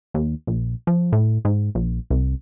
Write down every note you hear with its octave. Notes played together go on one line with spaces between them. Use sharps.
D#2
A#1
F3
A2
G#2
A#1
C2